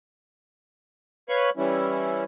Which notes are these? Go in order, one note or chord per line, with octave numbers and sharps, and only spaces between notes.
B4 C#5 F5 B5 C#6
E3 G3 C#4 E4